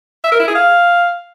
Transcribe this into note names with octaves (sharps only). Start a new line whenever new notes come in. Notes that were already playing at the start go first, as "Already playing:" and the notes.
E5
A#4
E4
G#4
F5